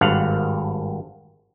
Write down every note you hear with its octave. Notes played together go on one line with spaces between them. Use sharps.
G#1 G2 F5 F#5